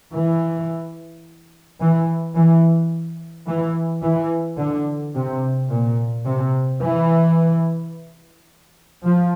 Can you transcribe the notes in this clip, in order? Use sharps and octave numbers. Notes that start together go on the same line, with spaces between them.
E3
E3
E3
E3
E3
D3
C3
A#2
C3
E3
F3